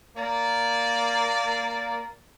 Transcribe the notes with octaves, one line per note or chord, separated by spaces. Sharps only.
A#3 D5